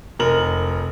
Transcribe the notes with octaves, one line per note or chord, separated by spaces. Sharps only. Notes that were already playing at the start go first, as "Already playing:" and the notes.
F1 A#4 F#7